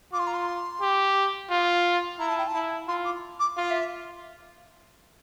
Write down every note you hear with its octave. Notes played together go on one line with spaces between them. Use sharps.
F4 D6
C6
A#5
C6
G4
F4
E4 A#5
A5
G5
A5
E4
F4 C6
D6
D6
F4 F5
E5